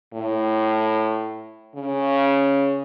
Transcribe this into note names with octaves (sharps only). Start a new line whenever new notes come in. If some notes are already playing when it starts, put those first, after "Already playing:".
A2
C#3